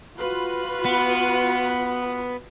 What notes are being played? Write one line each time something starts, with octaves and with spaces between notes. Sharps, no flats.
F4 F#4 B4
B3